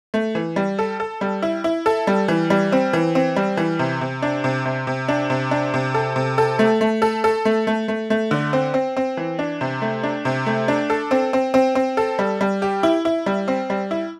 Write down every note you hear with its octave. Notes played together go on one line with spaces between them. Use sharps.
A3
E3
G3
A4
A4
G3
E4
E4
A4
G3
E3
G3
C4
E3
C4
G3
E3
C3
C3
D4
C3
C3
C3
D4
C3
D4
C3
A4
C3
A4
A3
A3
A4
A4
A3
A3
A3
A3
D3
C4
C4
C4
E3
D4
C3
A3
D4
C3
A3
D4
A4
C4
C4
C4
C4
A4
G3
G3
G4
E4
E4
G3
C4
G3
E4